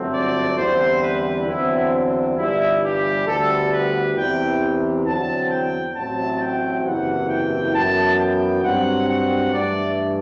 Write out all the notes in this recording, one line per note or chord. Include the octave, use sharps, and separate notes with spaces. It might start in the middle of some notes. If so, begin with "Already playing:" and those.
Already playing: G1 F#2 F#3 A3 C4
D5
E2 D3 G3 C4 C5
B4
E2 D3 F#3 C4 E4
G1 G2 E3 G3 E4
G4
D2 D3 G3 B3 A4
B4
E2 C3 E3 G5
E2 D3 F#3 C4 A5
G5
A1 A2 F#3 C4 A5
G5
F#1 E2 C3 E3 F#5
G5
F#2 E3 B3 A5
G5
G2 F#3 C4 F#5
F#5
G2 E3 A3 D5